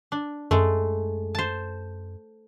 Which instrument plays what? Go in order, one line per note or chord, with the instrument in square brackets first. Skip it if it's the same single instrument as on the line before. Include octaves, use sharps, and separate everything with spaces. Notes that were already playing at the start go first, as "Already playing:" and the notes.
[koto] D4
[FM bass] F#2 [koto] G#3 A3
[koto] C5 A5